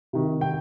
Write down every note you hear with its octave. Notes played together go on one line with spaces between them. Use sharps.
C3 D#3
G5